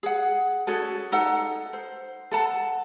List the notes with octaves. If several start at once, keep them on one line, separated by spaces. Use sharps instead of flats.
G#4 F#5
C#4 F#4 G#4 A4
D#4 A4 F#5
C5
A4 F#5 A5